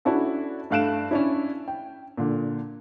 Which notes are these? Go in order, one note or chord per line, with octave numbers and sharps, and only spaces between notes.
C#4 D4 E4 F#4 A4
G2 A3 F5 F#6 D7 E7
C#4 D4 E4
G5
A#2 D3